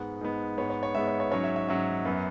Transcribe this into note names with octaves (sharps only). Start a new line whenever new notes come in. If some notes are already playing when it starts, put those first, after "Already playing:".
Already playing: G#2 G#3 B3 F#5
G#2 G#3 B3
G#2 G#3 B3 C#5
C#5
C#5
G#2 G#3 B3 E5
C#5
C#5
G#2 F#3 C#4 C#5
E5
E5
G#2 F#3 C#4 E5
F#2 F#3 B3